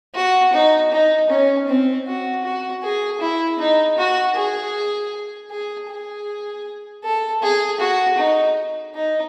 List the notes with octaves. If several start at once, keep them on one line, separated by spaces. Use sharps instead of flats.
F#4
D#4
D#4
C#4
C4
F#4
F#4
G#4
E4
D#4
F#4
G#4
G#4
G#4
A4
G#4
F#4
D#4
D#4